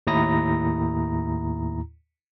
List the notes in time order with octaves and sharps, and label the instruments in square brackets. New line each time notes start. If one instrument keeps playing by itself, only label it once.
[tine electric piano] D#2 A2 E4 A#5 D#6 A#6